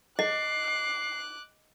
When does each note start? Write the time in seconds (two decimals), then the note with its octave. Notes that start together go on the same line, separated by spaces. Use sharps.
0.19 D#5 D6 F#6 C7